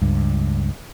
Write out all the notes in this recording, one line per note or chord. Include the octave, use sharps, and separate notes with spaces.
C#2 G2